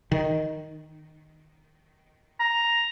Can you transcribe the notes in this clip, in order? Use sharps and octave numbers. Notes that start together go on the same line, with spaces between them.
D#3
A#5